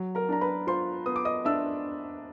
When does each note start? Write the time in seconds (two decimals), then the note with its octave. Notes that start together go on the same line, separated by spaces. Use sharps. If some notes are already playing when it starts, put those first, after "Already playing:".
Already playing: F#3
0.15 A#4 A#5
0.29 D4 A#5
0.41 B4 B5
0.67 F4 C5 C6
1.06 B3 D#6
1.16 D6
1.25 D#5 D#6
1.45 D4 E5 E6